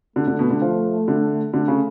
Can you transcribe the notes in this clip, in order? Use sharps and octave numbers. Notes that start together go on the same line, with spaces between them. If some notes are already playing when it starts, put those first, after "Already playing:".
D3 A3
D3
B2
D3
F3
D3
D3 A3
C#3